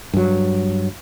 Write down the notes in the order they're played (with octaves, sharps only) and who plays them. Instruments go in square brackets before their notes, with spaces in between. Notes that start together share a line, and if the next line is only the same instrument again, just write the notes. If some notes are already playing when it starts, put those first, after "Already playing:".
[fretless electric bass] G2 F#3